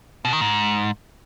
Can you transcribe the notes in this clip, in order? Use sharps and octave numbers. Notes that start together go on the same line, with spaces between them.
B2
D#3
G#2